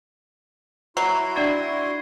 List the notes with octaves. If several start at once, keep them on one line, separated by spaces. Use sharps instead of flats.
F#3 E4 F#4 C6 C7
D4 D5 C#6 G#6 A6 C7